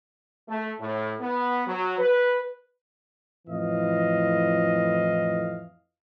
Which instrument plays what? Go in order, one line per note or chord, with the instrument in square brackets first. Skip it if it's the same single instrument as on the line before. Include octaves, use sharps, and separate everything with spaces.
[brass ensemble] A3
A2
B3
F#3
B4
F2 A2 E3 D#5 F5